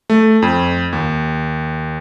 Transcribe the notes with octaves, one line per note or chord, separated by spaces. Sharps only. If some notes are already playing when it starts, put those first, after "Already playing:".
A3
F2
D#2